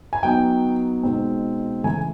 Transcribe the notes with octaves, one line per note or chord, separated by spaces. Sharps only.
G#5
F#3 B3 D#4 G5
B2 G#3 C4 D#4
C#3 E3 A3 G#5